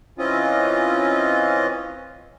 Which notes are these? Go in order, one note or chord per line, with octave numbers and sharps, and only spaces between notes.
E3 C4 C#4 F4 D#5